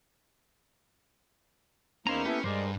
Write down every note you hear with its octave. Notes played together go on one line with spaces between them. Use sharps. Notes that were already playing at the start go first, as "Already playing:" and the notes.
E2 A#3 C#4 D#4 E4 C5 A#5
A#3 B3 E4 G4 A4 B4
G2 G#3 G#4 A#4 C5 D5